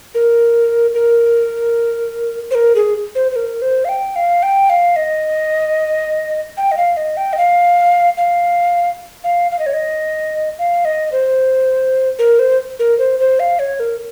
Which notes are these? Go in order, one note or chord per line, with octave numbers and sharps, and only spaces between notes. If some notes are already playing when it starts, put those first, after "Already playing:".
A#4
A#4
C5
A#4
G#4
C5
C5
A#4
C5
F5
G5
F5
G5
F5
D#5
G5
D#5
F5
D#5
G5
D#5
F5
F5
F5
F5
D#5
C#5
D#5
F5
D#5
C5
A#4
C5
A#4
C5
C5
F5
C#5
A#4